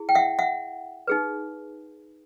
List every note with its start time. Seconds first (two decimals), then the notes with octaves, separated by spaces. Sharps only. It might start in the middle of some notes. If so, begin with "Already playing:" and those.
Already playing: E4 G#4
0.09 G5
0.15 E5 F#5
0.39 E5 F#5
1.07 D#4 G#4 B4